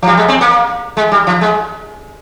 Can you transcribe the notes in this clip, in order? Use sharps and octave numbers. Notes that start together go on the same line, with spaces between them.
F3
G3
G#3
C4
A#3
G#3
G3
F3
G#3